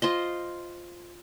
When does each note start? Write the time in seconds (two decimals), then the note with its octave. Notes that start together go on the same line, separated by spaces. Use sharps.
0.02 F4 C5 D#5